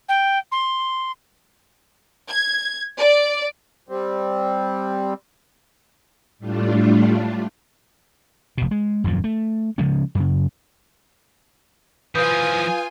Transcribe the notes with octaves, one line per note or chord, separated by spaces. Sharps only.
G5
C6
G#6
D5
G3 C4
A2 G3 A3 D4 F4
F1 B2
G#3
D#1 F#2 A#2 F3
A3
C#3 F3 G#3 C#4
F#2 C#3
E3 F3 F4 B4 G#5 D#6 G6